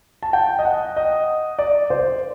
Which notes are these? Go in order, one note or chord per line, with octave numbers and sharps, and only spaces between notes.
A5
G5
D#5
F#5
D#5
D5
C5